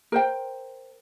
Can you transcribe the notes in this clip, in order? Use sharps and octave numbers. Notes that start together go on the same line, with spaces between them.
A#4 C5 G5